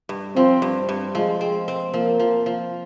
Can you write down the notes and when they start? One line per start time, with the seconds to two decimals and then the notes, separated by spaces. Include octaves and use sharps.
0.09 G2
0.36 F3 C4
0.62 G2
0.89 G2
1.15 F3 G#3
1.41 C4
1.68 C4
1.93 F3 A#3
2.20 F3
2.46 F3